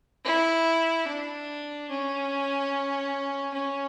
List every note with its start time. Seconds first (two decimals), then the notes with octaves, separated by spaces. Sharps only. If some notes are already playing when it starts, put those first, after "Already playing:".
0.25 E4
1.07 D4
1.90 C#4
3.53 C#4